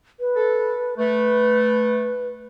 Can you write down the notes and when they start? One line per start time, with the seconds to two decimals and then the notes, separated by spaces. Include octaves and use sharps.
0.20 B4
0.36 A4
0.98 A3 B4